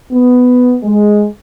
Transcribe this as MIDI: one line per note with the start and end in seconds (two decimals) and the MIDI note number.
0.11 0.75 59
0.83 1.26 56